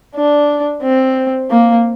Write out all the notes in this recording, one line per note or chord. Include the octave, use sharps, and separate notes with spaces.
D4
C4
A#3